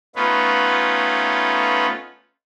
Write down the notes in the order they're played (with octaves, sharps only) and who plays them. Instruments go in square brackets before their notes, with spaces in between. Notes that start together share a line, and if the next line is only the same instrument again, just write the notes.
[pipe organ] A3 B3 C#4 D#4 F4 B4